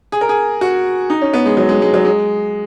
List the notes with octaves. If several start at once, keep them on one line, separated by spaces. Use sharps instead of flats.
G#4
A#4
G#4
F#4
D#4
C#4
B3
G#3
F#3
G#3
G#3
F#3
G#3